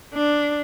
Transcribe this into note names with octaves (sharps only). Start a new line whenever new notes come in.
D4